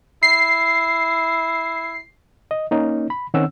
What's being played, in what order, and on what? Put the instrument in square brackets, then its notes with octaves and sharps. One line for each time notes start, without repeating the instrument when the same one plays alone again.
[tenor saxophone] E4 [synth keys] C7
[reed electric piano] D#5
A#3 C#4 D#4
B5
D#3 C4 C#4 F#5 E6